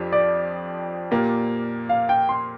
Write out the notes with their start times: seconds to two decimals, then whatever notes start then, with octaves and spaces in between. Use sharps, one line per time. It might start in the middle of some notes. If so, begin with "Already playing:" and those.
Already playing: F2 F3 D4 G4
0.12 D5
1.11 A#2 A#3 G4
1.89 F5
2.09 G5
2.29 C6